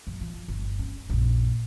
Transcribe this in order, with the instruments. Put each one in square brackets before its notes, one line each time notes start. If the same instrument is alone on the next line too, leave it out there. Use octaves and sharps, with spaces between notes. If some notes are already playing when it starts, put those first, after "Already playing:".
[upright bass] F#2
F3
G1
C#4
A#1 F#2